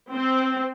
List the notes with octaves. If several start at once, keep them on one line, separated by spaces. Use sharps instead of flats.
C4